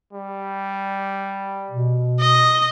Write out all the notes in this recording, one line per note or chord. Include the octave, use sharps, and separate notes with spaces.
G3
B2
D#5